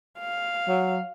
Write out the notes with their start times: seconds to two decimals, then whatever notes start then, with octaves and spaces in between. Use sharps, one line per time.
0.20 F5
0.68 F#3